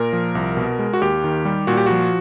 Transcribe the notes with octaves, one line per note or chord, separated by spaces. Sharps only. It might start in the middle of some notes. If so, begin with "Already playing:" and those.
Already playing: A#2 A#4
F3
C2
B2
G#3
F#4
D#2 G4
D#3
G3
A#2 F#4
G4
F3 F#4